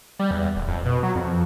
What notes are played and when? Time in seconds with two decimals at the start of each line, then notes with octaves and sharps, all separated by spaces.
0.19 G3
0.31 E2
0.56 D#1
0.68 F2
0.86 B2
1.03 F#3
1.15 F2
1.29 F2